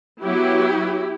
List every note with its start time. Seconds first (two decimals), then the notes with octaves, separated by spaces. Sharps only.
0.23 F#3 B3 E4 G4